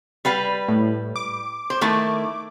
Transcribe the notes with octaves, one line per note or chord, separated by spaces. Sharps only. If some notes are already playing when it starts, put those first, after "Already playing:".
G3 B4 F5
A2
D6
C5
D#3 A3 E4